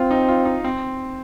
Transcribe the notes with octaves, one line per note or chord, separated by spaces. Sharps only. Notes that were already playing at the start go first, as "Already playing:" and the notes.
Already playing: C4 F4
D#4
F4
D#4
C4